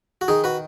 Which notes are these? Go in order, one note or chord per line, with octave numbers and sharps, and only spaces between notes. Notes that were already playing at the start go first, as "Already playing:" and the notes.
F#4
D#3 D#4 G#4
F#4 B4